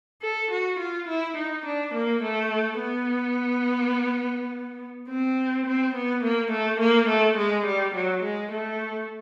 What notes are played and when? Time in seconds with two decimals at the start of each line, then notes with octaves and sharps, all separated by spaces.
0.22 A4
0.51 F#4
0.79 F4
1.08 E4
1.36 D#4
1.65 D4
1.94 A#3
2.22 A3
2.79 B3
5.08 C4
5.66 C4
5.94 B3
6.23 A#3
6.51 A3
6.80 A#3
7.08 A3
7.37 G#3
7.66 G3
7.94 F#3
8.23 G#3
8.52 A3